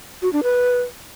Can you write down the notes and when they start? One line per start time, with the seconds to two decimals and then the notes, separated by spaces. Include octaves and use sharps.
0.22 F#4
0.33 D4
0.43 B4